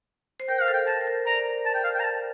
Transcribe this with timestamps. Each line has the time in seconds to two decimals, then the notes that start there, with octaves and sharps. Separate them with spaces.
0.40 C5
0.49 A#4 G5
0.61 F5
0.68 A4
0.73 G5
0.87 A#4 A5
1.01 C5
1.07 A#4
1.26 D5 A#5
1.66 A5
1.74 G5
1.84 F5
1.95 G5
1.99 A#5
2.04 A5